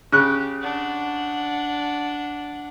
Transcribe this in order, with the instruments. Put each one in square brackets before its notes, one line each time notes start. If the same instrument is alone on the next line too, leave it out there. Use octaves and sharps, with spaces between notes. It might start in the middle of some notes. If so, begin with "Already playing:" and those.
[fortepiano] C#3 F#6 [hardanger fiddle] G4
[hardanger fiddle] D4 F#5